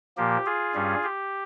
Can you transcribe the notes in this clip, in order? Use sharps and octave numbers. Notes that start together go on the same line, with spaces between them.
A#2 F3 A#3 G4
F4 G#4
G2 G3 C#4
G4